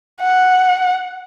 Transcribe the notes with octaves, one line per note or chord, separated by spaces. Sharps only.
F#5